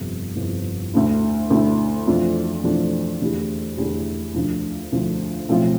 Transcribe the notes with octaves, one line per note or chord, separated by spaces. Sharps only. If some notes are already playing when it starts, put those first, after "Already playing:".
Already playing: G1 F2 C3
G1 F2 C3
D2 D3 A3 E4
D2 D3 A3 E4
F2 E3 A3 D4 F4
F2 E3 A3 D4 F4
E2 D3 A3 E4 G4
E2 D3 A3 E4 G4
D2 D3 F3
D2 D3 F3
B1 A2 F3 C4 F4